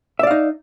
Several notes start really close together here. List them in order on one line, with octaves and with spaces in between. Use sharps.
E5 D5 F5 D#4